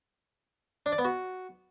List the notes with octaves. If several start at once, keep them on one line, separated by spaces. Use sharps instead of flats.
D4
D5
B3
F#4